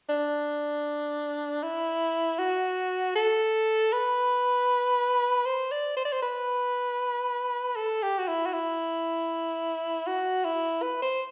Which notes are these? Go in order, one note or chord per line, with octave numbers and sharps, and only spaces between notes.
D4
E4
F#4
A4
B4
C5
D5
C5
D5
C5
B4
A4
G4
F#4
E4
F#4
E4
F#4
E4
B4
C5